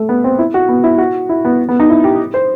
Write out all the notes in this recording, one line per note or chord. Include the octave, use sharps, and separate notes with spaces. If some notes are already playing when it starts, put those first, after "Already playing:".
Already playing: A3
B3
C4
E4
F#4
B3
E4
F#4
E4
B3
B3
D#4
E4
G4
C5